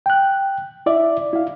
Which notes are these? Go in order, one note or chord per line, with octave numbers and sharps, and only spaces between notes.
G5 F#6
E4 D5 E5
E4 F5